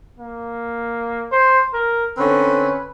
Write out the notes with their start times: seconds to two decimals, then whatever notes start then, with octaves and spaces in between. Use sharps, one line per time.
0.19 A#3
1.32 C5
1.74 A#4
2.18 D3 C4 C#4 B4